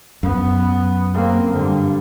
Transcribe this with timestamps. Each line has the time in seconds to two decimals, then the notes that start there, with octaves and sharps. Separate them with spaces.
0.23 F#2 B3
1.14 A#3 C4
1.52 G2 D3